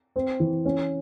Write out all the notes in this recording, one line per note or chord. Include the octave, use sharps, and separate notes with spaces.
C4
E3
C#4